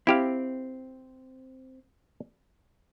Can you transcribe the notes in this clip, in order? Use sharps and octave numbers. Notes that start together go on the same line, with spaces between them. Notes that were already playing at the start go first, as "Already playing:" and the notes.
C4 E4 G4 F5